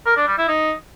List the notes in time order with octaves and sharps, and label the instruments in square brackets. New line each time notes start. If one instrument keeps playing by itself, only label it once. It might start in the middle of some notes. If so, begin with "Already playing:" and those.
[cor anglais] A#4
D4
G3
E4
D#4